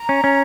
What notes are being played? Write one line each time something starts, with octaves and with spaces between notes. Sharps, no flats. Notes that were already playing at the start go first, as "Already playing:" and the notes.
Already playing: A#5
C#4
C#4